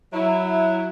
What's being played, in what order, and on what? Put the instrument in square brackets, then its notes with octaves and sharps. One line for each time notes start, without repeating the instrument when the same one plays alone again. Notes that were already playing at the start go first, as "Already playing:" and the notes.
[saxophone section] F#3 E4